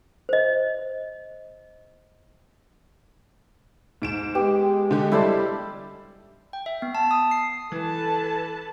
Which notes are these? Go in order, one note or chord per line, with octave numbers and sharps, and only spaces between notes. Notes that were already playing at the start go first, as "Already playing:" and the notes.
C5 D#5
G#2 D7 E7
G#3 B3 G4
D3 G4
G3 E4 G4 A4 C5 D5
G5
E5
B3
A5
D#6
C7
E3 A4 B4 A5